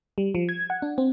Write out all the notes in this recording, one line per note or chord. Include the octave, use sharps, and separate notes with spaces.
G3
F3
G#6
F#5
D4
C4